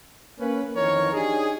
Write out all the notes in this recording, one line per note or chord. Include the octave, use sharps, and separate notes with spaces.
A#3 C#4 B4
F2 D#3 E3 A#4 C#5
D4 D#4 G4 G#4